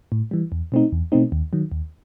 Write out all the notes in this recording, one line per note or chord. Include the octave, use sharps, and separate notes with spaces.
A2
E3 G3
E2
B2 A3 C4 D#4
E2
B2 A3 C4 D#4
D#2
D#3 F#3
D#2